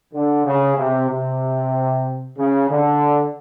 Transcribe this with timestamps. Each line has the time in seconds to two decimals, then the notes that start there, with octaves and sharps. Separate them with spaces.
0.13 D3
0.45 C#3
0.77 C3
1.10 C3
2.38 C#3
2.70 D3